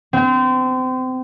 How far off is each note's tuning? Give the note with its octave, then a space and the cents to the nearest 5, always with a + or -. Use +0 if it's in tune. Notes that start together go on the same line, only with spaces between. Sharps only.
C4 -30